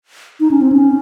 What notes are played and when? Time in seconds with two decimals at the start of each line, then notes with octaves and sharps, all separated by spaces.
0.40 D#4
0.51 C#4
0.61 C4
0.72 C#4